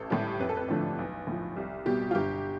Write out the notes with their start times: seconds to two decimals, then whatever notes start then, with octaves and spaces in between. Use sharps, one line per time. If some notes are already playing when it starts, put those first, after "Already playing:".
Already playing: A1 A4
0.10 A2 G3 G4
0.39 F2 B4
0.49 A4
0.57 B4
0.68 D3 F3 A3 D4
0.99 B1
1.27 A2 F3
1.56 C2
1.86 B2 G3 G4
2.11 F4
2.15 G1 G4